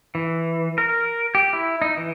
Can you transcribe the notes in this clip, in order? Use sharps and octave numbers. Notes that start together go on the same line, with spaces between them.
E3
A#4
G4
E4
D#4
E3